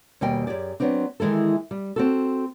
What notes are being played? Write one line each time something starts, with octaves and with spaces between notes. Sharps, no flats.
D#2 B2 G3 D#5 G5 G#5
F#2 G4 G#4 D5
F#3 B3 C4 D4
D#3 E3 G#3 E4 A4
G3
C4 F#4 A4